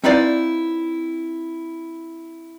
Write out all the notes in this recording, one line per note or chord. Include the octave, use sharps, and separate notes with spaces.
C4 D#4 E4 B4 D5 F5